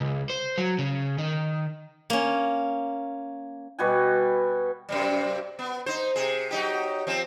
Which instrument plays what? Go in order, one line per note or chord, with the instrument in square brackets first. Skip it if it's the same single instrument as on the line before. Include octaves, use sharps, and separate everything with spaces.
[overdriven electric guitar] C#2
C5
F#3
C#3
D#3
[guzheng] A#3 C#4
[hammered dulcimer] B2 G3 F#4 G#5
[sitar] F#2 C3 G3
B3
D#4 C5
C3 G#4
F#3 D#4 G4
F3 C4